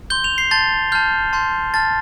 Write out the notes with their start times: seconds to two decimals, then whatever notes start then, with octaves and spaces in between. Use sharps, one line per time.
0.10 C6 G6 G7
0.24 F7
0.38 C7
0.51 A5 C6 G6 A6
0.92 A5 F6 G6
1.33 A5 C6 G6
1.74 A5 F6 A6